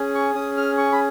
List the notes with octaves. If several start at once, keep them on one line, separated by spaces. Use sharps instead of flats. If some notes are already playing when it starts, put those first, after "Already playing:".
Already playing: C#4 G#4
C#6
C#4 G#4 D#6
F6
C#6
B5